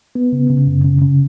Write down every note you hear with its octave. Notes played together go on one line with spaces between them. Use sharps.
B3
C#3
C#3
F#2
C#3
C#3